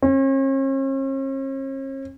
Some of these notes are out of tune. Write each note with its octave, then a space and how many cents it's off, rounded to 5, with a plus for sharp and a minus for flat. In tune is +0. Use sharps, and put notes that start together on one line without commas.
C#4 -45